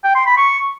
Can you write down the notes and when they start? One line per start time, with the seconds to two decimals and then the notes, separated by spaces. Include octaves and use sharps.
0.04 G5
0.15 C6
0.26 B5
0.37 C#6